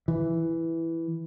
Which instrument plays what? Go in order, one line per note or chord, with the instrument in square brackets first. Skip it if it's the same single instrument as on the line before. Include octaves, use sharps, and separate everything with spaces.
[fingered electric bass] E3